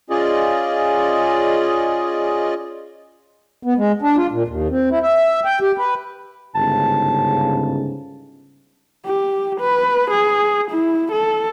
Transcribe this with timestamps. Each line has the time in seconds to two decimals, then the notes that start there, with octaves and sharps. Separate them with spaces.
0.10 C#4 F4 G#4 D5 D#5
3.63 B3
3.77 G#3
4.02 D4
4.17 F4
4.32 A#2
4.48 D#2
4.70 C4
4.91 E4
5.03 E5
5.45 G5
5.61 G4
5.78 B4
6.55 G1 G#2 C#3 A5
9.06 G4
9.60 B4
10.10 G#4
10.71 E4
11.12 A4